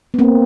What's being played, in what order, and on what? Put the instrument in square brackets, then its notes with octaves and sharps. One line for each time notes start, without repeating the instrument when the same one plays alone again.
[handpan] B3
A#3 C4